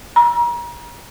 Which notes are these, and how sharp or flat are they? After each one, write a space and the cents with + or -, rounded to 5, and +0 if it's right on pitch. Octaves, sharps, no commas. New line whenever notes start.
A#5 +35